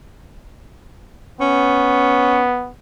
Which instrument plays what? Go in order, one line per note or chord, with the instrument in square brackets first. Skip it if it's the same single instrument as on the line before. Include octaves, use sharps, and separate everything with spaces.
[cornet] B3 [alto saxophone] C#4